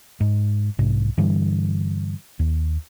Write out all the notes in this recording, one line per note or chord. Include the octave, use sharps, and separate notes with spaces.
G#2
B1 G#2 C3
G2 D3 E3 G3
D#2